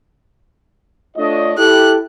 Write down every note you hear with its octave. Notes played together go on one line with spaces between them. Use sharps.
A3 D4 F4 C#5 D#5
E4 G4 A4 F#6